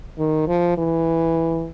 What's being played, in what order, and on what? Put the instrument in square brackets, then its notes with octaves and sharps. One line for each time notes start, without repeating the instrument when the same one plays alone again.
[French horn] D#3
F3
E3